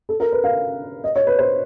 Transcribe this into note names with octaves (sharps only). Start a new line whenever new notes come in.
A4
A#4
B4
F5
D#5
C#5
B4
C5